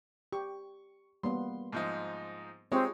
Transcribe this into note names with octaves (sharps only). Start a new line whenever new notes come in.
G4 C#6
G3 A#3 B3 C6
G#2 F3 D#4
G#3 C4 D#4 F4 G4 C#5 D#5